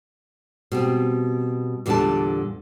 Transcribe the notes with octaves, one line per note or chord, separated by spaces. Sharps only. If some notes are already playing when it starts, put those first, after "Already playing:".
B2 G3 C4
E2 A#2 D3 G3 D4 A5